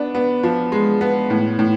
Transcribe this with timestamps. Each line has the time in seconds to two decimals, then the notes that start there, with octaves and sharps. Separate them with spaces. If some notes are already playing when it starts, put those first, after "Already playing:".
Already playing: B3 D4
0.15 B3
0.43 F3
0.72 G#3
1.01 B3
1.30 A2
1.59 A2